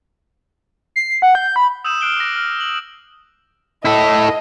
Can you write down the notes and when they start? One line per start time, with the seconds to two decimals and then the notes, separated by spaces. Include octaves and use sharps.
0.96 C7
1.22 F#5
1.35 G6
1.56 B5
1.85 D#6 E6 G6 D#7 E7
2.01 F6 F#6 C7 D7 E7 G7
2.17 D6 F#6 A#6
2.36 F6
2.60 F#7
3.85 E4 A4 D#5